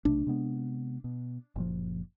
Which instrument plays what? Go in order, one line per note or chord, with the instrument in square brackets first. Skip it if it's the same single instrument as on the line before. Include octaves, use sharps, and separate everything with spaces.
[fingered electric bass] B1 C3 A3 [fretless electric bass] D4
[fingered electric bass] C3 G#3 B3
B2
F#1 A#2 F3